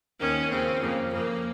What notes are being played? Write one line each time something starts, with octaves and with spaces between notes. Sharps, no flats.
D#2 D#3 C#4
D#2 C#3 F3 C4
F2 C#3 F3 A#3
F2 C#3 F3 A#3